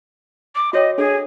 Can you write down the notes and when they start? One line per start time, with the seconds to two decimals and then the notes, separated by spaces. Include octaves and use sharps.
0.55 D6
0.73 F#4 C#5 D#5 G5
0.98 D4 G#4 A4